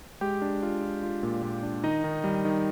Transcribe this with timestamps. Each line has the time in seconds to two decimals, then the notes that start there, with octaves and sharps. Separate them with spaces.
0.21 G#3 G4 G5
0.42 D4
0.63 F4
0.82 F4
1.03 F4
1.23 A#2
1.43 A#2
1.63 D4
1.84 D#3 D#4 D#5
2.04 D#3
2.24 G3
2.45 D#3